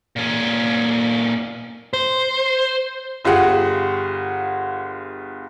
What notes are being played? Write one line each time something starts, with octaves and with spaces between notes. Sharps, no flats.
A#2 C#4
C5
G1 F4 G4 G#4 F#5